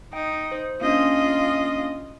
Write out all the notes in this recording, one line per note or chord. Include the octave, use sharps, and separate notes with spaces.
D#4 G5
C5
A#3 C#4 D4 F4 D#5